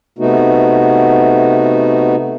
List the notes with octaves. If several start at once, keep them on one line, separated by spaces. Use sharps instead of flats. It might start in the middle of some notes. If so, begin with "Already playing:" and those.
C3 A3 B3 D#4 F#4